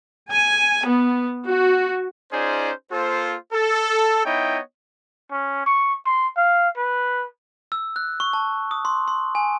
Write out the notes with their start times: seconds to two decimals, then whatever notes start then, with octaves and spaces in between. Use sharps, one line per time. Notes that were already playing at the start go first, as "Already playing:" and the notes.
0.32 G#5
0.86 B3
1.47 F#4
2.33 C#4 D#4 F4 G#4 C5 D5
2.92 A#3 F4 A4 C5
3.53 A4
4.24 B3 D#4 E4 C#5 D#5 G5
5.31 C#4
5.66 C#6
6.06 C6
6.37 F5
6.77 B4
7.72 E6
7.96 F#6
8.20 C#6
8.33 A5
8.71 D#6
8.85 C6
9.08 C6
9.35 G#5